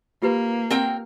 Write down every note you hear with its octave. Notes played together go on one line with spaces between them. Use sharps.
A#3 F4 G4 B4
C4 A#4 G5